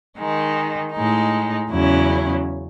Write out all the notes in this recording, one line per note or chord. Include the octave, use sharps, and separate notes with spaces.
D#3 G#3 D#4
A2 G#3 D#4
E2 C#3 F#3 C#4 E4